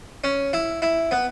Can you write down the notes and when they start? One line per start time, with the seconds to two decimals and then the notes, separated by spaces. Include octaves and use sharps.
0.24 C#4
0.53 E4
0.82 E4
1.11 B3